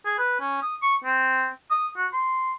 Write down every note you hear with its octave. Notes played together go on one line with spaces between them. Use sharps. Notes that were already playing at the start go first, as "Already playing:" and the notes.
G#4
B4
C#4
D#6
C#6
C4
D#6
F#4
C6